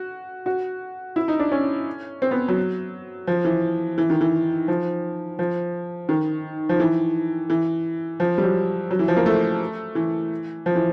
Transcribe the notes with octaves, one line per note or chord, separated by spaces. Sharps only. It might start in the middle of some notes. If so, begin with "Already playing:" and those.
Already playing: F#4
F#4
E4
D#4
D4
C#4
C4
B3
F#3
F3
E3
E3
D#3
E3
F3
F3
D#3
F3
E3
E3
F3
G3
F#3
F#3
E3
F3
A#3
A3
E3
F3
E3